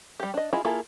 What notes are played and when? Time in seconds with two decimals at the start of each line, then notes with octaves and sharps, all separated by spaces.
0.20 G3 G4
0.34 D4 D#5
0.53 E4 F4 G#4 D#5
0.65 A#3 E4 F4 G#4 A4